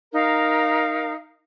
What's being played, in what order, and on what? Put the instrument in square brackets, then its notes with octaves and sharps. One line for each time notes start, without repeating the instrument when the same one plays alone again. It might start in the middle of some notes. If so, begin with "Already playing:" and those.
[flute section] D#4 A#4 F5